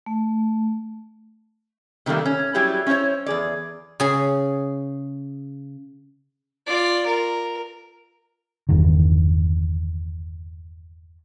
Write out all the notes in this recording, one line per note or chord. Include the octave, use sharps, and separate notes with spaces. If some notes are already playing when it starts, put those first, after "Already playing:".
A3
C3 D#3 G3 A3 A#3
C#4
F#3 G3 E4 G4 G#4
C#4 E4 F4 C5 C#5
E2 G#4 D5
C#3 G#4
F4 D5
A#4
G1 E2 G2 D#3